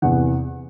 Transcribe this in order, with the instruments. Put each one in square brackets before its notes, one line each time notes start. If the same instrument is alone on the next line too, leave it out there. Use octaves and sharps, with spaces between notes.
[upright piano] E2 C3 E3 F#5